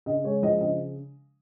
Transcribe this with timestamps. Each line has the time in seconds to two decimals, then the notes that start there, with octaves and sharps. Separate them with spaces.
0.06 C#3 D#5
0.24 G#3 C#5
0.42 F3 D#5
0.61 C#3 D#5